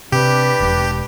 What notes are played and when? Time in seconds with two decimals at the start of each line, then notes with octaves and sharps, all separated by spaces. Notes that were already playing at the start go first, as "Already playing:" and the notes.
0.12 C3 D4 G4 B4
0.60 E1